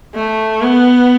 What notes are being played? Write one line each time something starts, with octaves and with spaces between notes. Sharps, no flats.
A3
B3